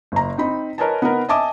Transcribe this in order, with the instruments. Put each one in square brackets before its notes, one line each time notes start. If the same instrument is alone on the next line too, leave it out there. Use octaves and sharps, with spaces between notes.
[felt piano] F#1 A#5
C4 D#4 B5
A#4 B4 C#5 D#5 G#5 A5
B3 D#4 A#4 B4
D#5 E5 G#5 A5 D6 D#6